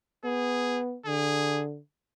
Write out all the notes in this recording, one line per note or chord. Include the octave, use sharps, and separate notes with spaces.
B3 G#4
D3 G#4